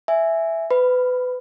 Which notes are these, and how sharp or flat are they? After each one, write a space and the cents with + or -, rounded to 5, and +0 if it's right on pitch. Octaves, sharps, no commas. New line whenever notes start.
E5 +0 G#5 +0
B4 +25 B5 +0